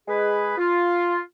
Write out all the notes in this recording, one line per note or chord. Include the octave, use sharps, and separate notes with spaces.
G#3 G#4 B4
F4